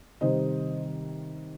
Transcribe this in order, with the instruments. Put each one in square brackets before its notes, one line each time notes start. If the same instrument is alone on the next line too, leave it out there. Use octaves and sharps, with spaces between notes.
[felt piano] C3 D#3 G3 C5 D#5